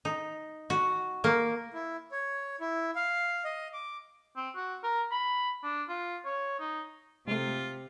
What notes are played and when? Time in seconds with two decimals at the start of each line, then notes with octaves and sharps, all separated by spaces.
0.05 D#4
0.70 F#4
1.24 A#3
1.74 E4
2.12 C#5
2.60 E4
2.95 F5
3.45 D#5
3.73 D6
4.37 C4
4.56 F#4
4.83 A#4
5.12 B5
5.64 D4
5.89 F4
6.25 C#5
6.60 D#4
7.28 C3 G#3 A3 F4